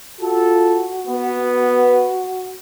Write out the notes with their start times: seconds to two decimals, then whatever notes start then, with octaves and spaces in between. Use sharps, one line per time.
0.21 F4 F#4 A4
1.06 B3